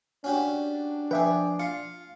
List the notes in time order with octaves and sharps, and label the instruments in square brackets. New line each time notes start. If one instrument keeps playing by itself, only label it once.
[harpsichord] C#4 F#4 G4 [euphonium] D4
[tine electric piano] F3 A5 D6 [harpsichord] G#4 G5 [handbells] B4 E5
[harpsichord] F4 [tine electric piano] C7 C#7